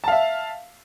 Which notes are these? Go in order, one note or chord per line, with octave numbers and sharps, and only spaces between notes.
E5 F5 A5